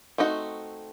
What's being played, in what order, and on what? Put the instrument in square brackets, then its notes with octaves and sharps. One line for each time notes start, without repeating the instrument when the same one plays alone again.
[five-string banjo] A3 C4 D#4 F#4